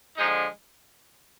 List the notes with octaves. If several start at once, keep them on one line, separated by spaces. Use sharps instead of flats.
D3 F3 G#3 D#4